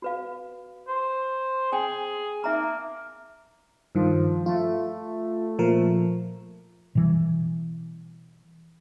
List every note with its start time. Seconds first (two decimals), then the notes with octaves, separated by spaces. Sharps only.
0.02 F#4 B4 F5
0.88 C5
1.72 G#4 G5 G#5
2.44 A#3 D#4 E5 A#5
3.95 G2 D#3 F3
4.46 A3 F4
5.59 A#2 F3 A#4
6.95 B2 E3 G3